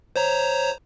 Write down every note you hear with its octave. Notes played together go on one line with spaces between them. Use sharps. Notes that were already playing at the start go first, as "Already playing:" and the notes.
C5 C#5 A#5